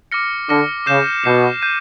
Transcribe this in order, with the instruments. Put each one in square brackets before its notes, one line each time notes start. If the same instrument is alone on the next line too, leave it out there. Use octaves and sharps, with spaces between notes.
[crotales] D6 F6 A#6 C#7
[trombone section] D3 [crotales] D6 F6 A#6 C#7
[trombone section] C#3 [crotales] D6 G6 C7 E7
[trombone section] B2 [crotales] D6 G6 C7 E7
[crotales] G6 C7 D#7